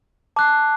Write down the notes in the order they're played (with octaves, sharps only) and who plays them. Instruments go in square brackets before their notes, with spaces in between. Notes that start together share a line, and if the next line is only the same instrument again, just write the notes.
[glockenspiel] A5 D6 F#6 C7